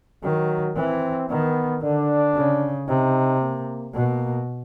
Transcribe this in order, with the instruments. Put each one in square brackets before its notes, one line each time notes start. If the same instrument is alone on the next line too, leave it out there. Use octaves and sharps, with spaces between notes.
[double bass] D#3 [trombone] F#3
[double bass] E3 [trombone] C4
[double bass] D#3 [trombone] B3
[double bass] D3 [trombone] D4
[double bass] C#3
[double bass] C3 [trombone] D#4
[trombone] A#3
[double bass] B2 [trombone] A#3